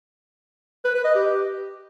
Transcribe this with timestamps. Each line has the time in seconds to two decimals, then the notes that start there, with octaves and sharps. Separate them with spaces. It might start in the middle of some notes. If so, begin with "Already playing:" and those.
0.85 B4
0.95 B4
1.05 D#5
1.15 G4